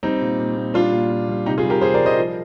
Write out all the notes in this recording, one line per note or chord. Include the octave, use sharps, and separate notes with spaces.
G3 C4 D#4
A#2
A#2
A#2
G3 D4 F4
A#2
A#2
G3
C3 D#4 G4
F4 G#4
G3
G4 A#4
G3 G#4 C5
A#4 D5
G3
C5 D#5
F3